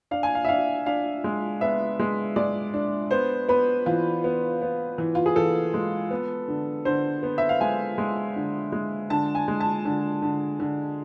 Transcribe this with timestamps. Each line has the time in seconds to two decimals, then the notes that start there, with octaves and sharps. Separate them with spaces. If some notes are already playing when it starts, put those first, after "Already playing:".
0.11 D4 F5
0.23 G#5
0.35 F5
0.45 E5
0.49 D4 F5
0.86 D4 F5
1.24 G#3
1.61 B3 E5
2.00 G#3
2.36 G#3 D5
2.74 D4
3.11 B3 C5
3.49 B3 B4
3.86 E3 F4
4.24 B3
4.62 B3
4.98 E3
5.15 F4
5.26 G#4
5.36 E3 A4
5.74 G#3
6.11 B3
6.48 D3
6.85 D3 C5
7.23 B3
7.38 E5
7.49 F5
7.61 G#3 G#5
7.98 G#3
8.36 D3
8.72 G#3
9.10 D3 A5
9.35 G#5
9.48 G#3
9.60 A5
9.85 D3
10.22 D3
10.60 D3